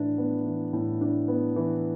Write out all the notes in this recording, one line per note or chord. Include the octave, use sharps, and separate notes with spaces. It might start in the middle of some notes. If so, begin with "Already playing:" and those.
Already playing: A2 E3 D4
B3
E3
A2
D4
B3
E3